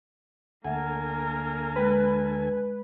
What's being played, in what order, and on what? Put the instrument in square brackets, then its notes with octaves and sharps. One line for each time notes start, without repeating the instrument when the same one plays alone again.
[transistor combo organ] D2 A4 G#5 [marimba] A3 E5 F#5 [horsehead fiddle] A#3 A#4
[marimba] G#3 G5 [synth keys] B4